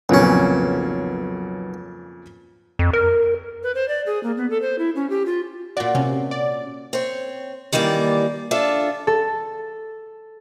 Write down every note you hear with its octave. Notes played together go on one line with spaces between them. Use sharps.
B1 F2 A#2 C#3 C#4
F2
A#4
B4
C5
D5
G#4
A#3
B3
A4
C5
E4
C#4
G4
F4
A#2 F#4 D5
C3 C#4
D5
C4 C#5
D#3 E3 G3 A#3 D5
D4 F4 A4 E5
A4